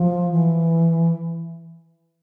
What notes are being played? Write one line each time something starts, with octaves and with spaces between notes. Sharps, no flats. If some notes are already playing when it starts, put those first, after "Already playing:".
Already playing: F3
E3